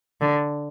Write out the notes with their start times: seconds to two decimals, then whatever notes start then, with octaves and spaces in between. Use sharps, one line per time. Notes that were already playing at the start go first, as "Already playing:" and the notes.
0.21 D3